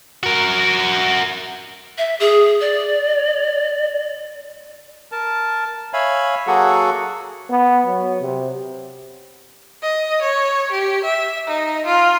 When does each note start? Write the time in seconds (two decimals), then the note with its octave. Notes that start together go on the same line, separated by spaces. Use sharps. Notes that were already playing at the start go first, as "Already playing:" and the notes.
0.23 F#4 A#4
1.98 E5
2.20 G#4
2.61 D5
5.12 A#4 A5
5.93 C#5 E5 F5 G#5 B5
6.47 F#3 A#3 F#4 G#4 A4 F#5
7.50 B3
7.86 F#3
8.20 C3
9.82 D#5
10.22 C#5
10.72 G4
11.04 E5
11.48 D#4
11.86 F4